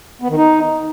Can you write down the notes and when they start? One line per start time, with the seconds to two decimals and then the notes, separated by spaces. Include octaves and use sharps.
0.22 B3
0.29 D#3
0.37 D#4